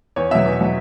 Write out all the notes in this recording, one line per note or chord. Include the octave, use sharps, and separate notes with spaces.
E2 C#5
B2 F#3 E5
E2
B2 F#3